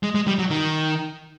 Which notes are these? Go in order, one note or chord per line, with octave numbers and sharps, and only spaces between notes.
G#3
G#3
G3
F#3
D#3